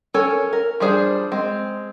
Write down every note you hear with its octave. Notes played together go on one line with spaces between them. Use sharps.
C#4 A4 A#4 C#5 G#5
A#4
F3 G3 D4 G#4 C5
G#3 C4